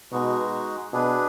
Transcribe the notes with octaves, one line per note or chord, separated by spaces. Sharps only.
B2 G#3 D#4 F#4
B2 D4 G#4 B4